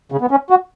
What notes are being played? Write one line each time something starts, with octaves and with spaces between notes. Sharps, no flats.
C#3
B3
C#4
F#4